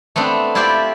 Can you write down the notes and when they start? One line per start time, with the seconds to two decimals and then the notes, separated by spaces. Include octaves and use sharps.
0.16 A3 B3 C4 D4
0.55 E4 F4 G4 C5 D5